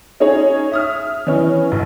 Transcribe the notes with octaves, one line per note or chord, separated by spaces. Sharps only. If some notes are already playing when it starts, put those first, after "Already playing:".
C#4 D#4 G#4 C#5
E5 D#6 F6
E3 C#4
A1